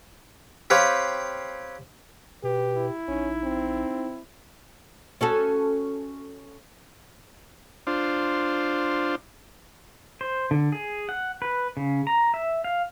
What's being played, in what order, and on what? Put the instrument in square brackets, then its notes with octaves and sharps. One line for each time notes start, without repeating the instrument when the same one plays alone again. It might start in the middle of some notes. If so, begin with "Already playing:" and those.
[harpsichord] C4 G4 B4 C#5 F5
[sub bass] B2 [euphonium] G4 [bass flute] B4
[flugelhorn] E4
[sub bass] A#1 [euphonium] C#4 [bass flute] D#4
[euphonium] C4
[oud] C#4 F#4 A4
[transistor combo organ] D4 F4 C5
[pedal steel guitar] C5
D3
G#4
F#5
B4
C#3
A#5
E5
F5